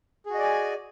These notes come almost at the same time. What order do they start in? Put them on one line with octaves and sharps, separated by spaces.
G#4 F#4 D#5 D5 G#5